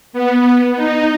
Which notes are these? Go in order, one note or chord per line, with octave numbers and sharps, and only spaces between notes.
B3
D#4